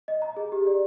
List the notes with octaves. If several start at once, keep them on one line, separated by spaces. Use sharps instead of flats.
D#5
A#5
G#4
G4
D5